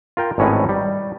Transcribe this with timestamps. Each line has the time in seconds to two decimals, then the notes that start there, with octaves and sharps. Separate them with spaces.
0.17 F4 A#4 G5
0.38 G#1 A2 C#4 D#4 B4 G#5
0.69 G3